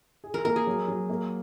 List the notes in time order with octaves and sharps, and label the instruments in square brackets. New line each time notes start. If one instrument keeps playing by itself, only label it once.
[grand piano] G#4
[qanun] A#4
[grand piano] A#3 [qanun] A#4
[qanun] G#4
[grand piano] F#3
F#3
A#3